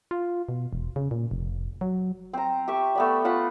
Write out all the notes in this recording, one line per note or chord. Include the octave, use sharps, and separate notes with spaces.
F4
B2
E1
C#3
A#2
F1
F#3
C4 A#5
G4 E5 C#6
A3 B3 D5
F4 F#5 A5 B5